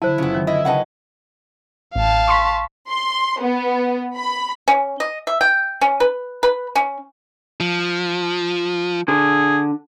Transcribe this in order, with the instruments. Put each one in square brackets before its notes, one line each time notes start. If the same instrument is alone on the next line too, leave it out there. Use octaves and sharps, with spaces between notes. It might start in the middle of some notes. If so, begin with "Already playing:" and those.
[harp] D3 F#3 [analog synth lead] E4 [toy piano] C5 A5
[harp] F#1 F4 B6 [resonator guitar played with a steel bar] C#3 B3
[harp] D#3 [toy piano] C#4
[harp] B3 F5 G#6 [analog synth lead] E4 [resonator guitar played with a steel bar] D#5
[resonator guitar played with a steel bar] C#3 B4 D#5 [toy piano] F#5 G5 A5
[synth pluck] A1 [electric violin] F5 A5
[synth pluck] C6 C#6 B6
[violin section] C6
B3
B5
[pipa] C#4
D#5
E5
G5
C#4
B4
B4
C#4
[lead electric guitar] F3
[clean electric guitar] D3 [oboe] G#4